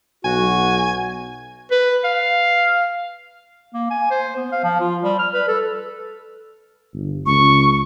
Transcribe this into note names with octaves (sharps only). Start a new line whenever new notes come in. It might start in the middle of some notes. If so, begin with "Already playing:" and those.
B1 F#4 G#5
B4
F5
A#3
G#5
C5
B3
F5
F3
F4
G3
F6
B4
A4
G1
C#2 C#6